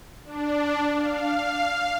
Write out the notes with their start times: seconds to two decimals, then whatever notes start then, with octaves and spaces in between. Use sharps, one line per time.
0.24 D4
0.95 F5